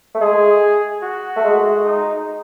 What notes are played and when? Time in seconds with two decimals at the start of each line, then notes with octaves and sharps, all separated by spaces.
0.14 A3
0.21 G#3 G#4
1.03 F#4
1.36 A3
1.44 G#3
1.85 D#4